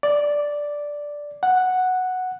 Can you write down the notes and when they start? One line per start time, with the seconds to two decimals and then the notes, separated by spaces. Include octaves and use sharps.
0.03 D5
1.43 F#5